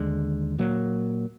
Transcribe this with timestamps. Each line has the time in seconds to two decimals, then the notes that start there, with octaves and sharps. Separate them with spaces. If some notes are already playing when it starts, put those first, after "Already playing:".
Already playing: D#2 D3 G#3
0.58 A#2 F#3 A#3